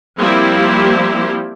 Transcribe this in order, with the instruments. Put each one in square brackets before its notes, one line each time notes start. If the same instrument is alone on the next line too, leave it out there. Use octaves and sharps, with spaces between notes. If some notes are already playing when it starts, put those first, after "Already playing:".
[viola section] F3 G3 A#3 C4 E4 G4